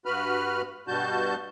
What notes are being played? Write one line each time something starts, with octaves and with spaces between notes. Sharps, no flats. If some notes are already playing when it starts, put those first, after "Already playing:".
G2 F#4 B4 B5 F6
G2 B2 G3 F#4 A5 G6